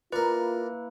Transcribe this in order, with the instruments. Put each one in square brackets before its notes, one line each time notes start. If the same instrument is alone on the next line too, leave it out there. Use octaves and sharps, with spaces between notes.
[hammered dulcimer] A#3 E4 A#5 [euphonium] F4 [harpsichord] A#4 D5 [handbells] B4